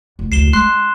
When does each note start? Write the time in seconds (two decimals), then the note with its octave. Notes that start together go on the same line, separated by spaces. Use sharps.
0.19 F1
0.32 D2 C#3 C7 E7 G7
0.53 G#3 C#4 C6 F#6 C7